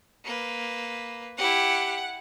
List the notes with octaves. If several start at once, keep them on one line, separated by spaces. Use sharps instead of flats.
A#3 B4
E4 G4 F#5